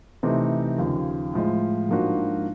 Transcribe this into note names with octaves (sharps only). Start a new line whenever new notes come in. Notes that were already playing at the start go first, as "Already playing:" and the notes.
C3 E3 A3 C4 D#4
D#2 C#3 F3
A2 F3 G#3
G#2 F3 A#3 D4 F#4